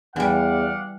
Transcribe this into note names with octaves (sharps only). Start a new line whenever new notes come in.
E2 E3 G3 D5 F5 F#5